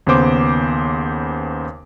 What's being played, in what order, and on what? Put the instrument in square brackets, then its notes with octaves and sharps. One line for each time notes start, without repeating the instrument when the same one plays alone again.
[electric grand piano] D#2 C#3 B3 C5 D6